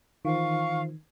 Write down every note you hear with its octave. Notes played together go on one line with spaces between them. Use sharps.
D#3 E3 F4 C5 F5 C#6